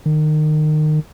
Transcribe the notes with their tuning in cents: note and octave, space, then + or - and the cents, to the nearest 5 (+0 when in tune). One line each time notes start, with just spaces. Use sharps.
D#3 -25